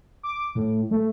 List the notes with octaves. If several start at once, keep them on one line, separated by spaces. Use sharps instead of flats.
D6
A2
A3